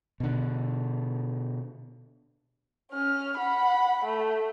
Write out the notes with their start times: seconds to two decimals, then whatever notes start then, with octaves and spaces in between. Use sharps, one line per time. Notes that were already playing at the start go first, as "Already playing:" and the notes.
0.20 B2 D3
2.91 C#4 F6
3.38 F#5 B5
4.05 A3